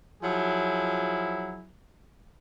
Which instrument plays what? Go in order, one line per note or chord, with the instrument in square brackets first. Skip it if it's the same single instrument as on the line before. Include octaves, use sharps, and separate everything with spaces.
[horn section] F3 F#3 E4 G#4